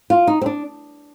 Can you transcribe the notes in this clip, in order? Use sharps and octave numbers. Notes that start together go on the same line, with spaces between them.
F4
D#4
C4
D4